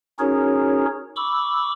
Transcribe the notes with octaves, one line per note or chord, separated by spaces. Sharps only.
C#4 D#4 F#4 G#4 A#4 C#5
B5 C#6 D6 E6